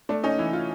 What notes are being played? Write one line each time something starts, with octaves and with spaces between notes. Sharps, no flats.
A3 D4
C#4 D#4
E3 E4
F4